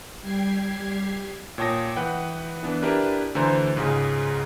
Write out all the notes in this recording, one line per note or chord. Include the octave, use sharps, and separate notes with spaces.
G3 G4 G#6 C7
A#2 C#5 G5 A5 D#6 A#6
E3 B4 F#5 G5
E3 B3 D4
D4 E4 G4 A#4 B4 D5
D2 D3 E3 C5 G#5 A#5
C#2 G#2 C#3 G#3 G#4